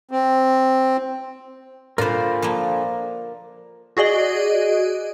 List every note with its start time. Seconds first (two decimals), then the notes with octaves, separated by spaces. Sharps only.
0.11 C4
1.98 A#2 D3 F4 A#4 C5 D5 B5
2.42 F3 A#3
3.97 F#4 G#4 D5 D#5